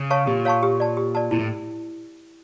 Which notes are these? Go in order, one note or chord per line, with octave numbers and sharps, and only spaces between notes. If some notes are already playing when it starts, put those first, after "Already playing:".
Already playing: C#3
C#5 F5 A5 C#6
A#2 G4
C#5 F5 A5 C#6
G4
D5 A5
G4
D5 A5
A#2 E4
A2